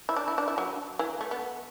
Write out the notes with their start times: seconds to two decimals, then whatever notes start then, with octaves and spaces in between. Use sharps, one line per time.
0.09 E4
0.16 D4
0.28 E4
0.38 D4
0.48 E4
0.58 F#3
0.99 E3
1.21 A3
1.31 B3